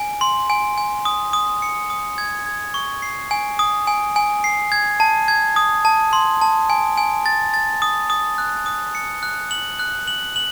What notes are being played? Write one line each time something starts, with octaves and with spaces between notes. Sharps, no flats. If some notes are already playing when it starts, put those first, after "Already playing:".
Already playing: G#5
C6
G#5
G#5
D#6
D#6
C#7
D#6
G#6
G#6
C#6
C7
G#5
D#6
G#5
G#5
C7
G#6
A5
G#6
D#6
A5
C6
A5
G#5
G#5
A6
A6
D#6
D#6
F#6
D#6
C#7
F#6
F#7
F#6
F#7
F#7